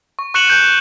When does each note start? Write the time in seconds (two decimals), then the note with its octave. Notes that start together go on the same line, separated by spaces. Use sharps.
0.19 C#6
0.34 C#6 F#6 C#7 E7 F#7
0.48 F#6 G6
0.63 E7